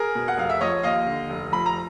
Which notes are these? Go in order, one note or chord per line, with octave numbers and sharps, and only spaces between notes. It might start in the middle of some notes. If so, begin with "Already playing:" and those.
Already playing: G#4 A#4
B2
F#5
F1 F5
E5
F3 C#5 D#5
D#2 D#5 F5
D3
F1
F3 B5
A#5